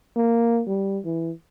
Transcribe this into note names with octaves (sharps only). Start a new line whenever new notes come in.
A#3
G3
E3